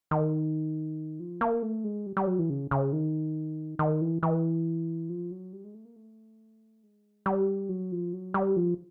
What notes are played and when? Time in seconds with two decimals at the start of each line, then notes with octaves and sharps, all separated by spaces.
0.11 D#3
1.20 F3
1.41 A#3
1.63 A3
1.84 G#3
2.06 G3
2.17 G3
2.27 F#3
2.39 E3
2.50 C#3
2.71 C#3
2.93 D#3
3.79 D#3
4.01 E3
4.23 E3
5.09 F3
5.31 F#3
5.53 G3
5.64 G#3
5.74 A3
5.85 A#3
5.96 A3
6.83 G#3
7.26 G3
7.69 F#3
7.92 F3
8.13 F#3
8.34 G3
8.56 F3